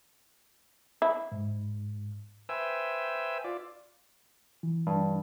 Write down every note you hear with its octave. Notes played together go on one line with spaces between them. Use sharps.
E4
G#2
B4 C5 E5 G5 G#5 E6
F4 D5
E3
G2